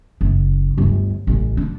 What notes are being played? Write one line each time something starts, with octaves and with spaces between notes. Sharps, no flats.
F#1
G1 D2
A1 D3
D4